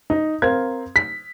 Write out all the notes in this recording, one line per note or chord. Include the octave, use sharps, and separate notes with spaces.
D#4
C4 A#4 F5 C6 G#6
B6